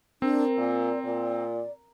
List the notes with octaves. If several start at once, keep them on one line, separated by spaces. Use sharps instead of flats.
C4 D4 A#4
A#2 D5
A#2 D5